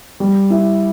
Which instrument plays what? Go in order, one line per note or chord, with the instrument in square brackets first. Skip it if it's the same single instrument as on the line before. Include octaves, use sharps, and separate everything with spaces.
[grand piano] G3
E4